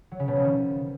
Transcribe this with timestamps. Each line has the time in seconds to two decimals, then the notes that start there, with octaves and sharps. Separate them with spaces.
0.11 F#3
0.20 C#3
0.28 B2
0.36 F3
0.44 D#3